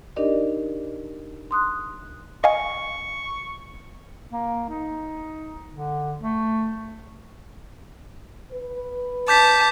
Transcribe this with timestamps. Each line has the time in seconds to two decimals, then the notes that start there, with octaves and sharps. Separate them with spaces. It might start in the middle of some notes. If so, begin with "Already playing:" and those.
0.16 D4 D#4 G4 A#4 D5 D#5
1.51 C6 D#6 F#6
2.44 D#5 F5 G#5 C#6
4.31 A#3
4.70 D#4
5.74 D3
6.19 A3
8.52 B4
9.28 A5 D6 G6 B6